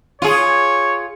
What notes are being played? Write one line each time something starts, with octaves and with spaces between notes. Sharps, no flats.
F4 G#4 C#5